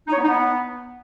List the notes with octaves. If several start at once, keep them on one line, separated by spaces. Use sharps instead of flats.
D#4
C#5
B3
D#4
B3